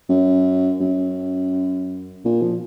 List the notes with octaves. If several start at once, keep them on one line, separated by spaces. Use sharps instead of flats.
F#2
F#2
A#2
F3